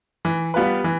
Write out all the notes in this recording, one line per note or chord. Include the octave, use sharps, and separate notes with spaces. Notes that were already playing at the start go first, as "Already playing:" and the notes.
E3
G3 B3 F4 B4
E3